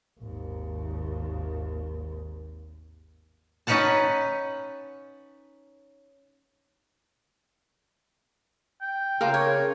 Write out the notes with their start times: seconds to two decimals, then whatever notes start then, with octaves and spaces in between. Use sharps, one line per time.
0.19 G#1 D#2
3.67 C#4 D#4 B4 F#5 A5
8.81 G5
9.21 C#3 F4 A4 A#4 D6
9.34 C#5